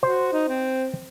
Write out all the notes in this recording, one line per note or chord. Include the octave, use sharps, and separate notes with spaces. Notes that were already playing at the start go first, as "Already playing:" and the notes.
F#4 C5
D#4
C4